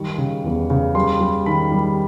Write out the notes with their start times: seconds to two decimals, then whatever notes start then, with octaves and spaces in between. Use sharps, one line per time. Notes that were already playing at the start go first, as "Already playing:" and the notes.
Already playing: D#3 G3 C#6
0.18 C#3
0.44 E2
0.70 C#3
0.95 G3 C6
1.21 G3
1.46 D#3 B5
1.72 G3